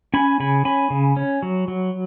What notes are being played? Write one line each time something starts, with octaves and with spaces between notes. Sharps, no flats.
C#4 G#5 B5
C#3 G#5 B5
C#4 G#5 B5
C#3
C#4
F#3
F#3